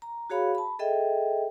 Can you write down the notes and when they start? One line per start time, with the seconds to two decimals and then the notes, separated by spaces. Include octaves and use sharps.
0.02 A#5
0.30 F#4 G#4 C#5 F5 B5
0.55 A5 B5
0.79 G#4 A4 D#5 E5 G5